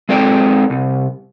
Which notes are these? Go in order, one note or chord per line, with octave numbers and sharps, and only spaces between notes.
G#3 C4 A4 D5 G5
C2